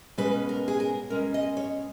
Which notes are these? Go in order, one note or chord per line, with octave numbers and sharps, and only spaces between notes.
B2 G#3 C#4 B4
A#4
G#4
A#4
B2 G#3 C#4 A#4
D#5
C#5